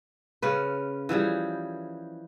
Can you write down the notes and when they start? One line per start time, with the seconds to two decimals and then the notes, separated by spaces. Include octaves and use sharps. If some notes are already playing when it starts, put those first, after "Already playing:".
0.42 C#3 C#4 B4
1.09 E3 F3 G3 G#4